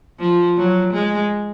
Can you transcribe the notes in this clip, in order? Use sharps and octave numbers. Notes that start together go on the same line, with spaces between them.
F3
F#3
G#3